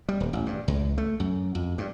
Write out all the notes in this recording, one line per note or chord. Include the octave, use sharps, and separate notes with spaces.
G3
D#1
A1
G2
C#2
A3
F#2
F2
G2